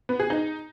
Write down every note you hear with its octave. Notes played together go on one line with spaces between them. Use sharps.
B3
G#4
D#4